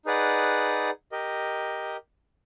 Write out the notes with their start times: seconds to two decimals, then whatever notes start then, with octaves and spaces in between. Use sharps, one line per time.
0.05 D#4 G#4 B4 D5 F#5
1.12 G4 A#4 D#5